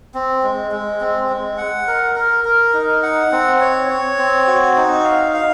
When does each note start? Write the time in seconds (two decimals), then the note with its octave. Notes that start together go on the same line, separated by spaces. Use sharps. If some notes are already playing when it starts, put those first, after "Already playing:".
0.14 C4
0.43 G#3
0.71 G#3
1.00 C4
1.29 G#3
1.58 F#5
1.87 A#4
2.16 A#4
2.45 A#4
2.74 D#4
3.03 F#5
3.32 C4
3.60 C#5
3.89 C#5
4.18 C4
4.47 F#4
4.76 D#4
5.04 F5
5.34 F5